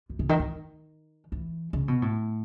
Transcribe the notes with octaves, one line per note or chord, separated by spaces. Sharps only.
F#2
C#3
D#3
D#3
E3
C#3
B2
A2